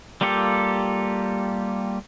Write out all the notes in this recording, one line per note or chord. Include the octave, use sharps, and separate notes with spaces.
G3 A#3 F4 G4 A4